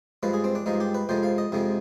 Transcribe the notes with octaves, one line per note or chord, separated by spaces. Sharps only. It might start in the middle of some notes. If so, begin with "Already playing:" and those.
G2 F3 G#3 B4
G#4
C4
D4
G2 F3 G#3 D#4
G4
B4
F2 C3 F3 G#3 C5
F5
D#5
F2 C3 F3 G#3